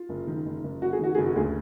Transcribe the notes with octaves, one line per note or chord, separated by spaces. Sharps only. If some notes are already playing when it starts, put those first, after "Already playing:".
Already playing: F4
F#1
D#3
F#1
F#1
F#1 F#4
G#4
D#3 F#4
F#1 G#4
F#4
D2 G#4